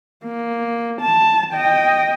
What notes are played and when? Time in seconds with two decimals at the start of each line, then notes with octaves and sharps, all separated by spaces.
0.24 A#3
1.01 A5
1.53 D#5 G5